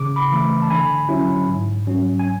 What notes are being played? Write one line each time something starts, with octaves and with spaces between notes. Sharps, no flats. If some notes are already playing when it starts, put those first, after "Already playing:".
Already playing: C#3 D6
B5 D6
E3 A3
A5
D3 G#5 B5
F#3 C#4 E4
G#2
F#3 C#4
G#5